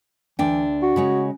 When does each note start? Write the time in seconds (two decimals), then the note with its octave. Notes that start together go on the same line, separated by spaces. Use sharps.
0.39 D2 E3 D4 G5
0.82 F#4
0.96 C#3 G#3 C#5